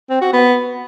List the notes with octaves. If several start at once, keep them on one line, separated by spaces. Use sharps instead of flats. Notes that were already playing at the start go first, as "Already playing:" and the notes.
C4
F#4
B3